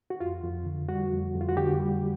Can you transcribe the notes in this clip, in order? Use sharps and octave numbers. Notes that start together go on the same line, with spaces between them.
F#4
F2 F4
F2
D3
G3 F#4
F2
F2
F4
F#4
D3 G4
G3